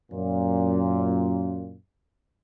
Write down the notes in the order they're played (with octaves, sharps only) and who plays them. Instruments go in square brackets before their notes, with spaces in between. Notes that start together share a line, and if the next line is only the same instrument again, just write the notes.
[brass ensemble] F#2 A#2